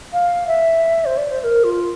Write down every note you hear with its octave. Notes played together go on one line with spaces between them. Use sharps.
F5
E5
C5
D5
C5
C5
A#4
F4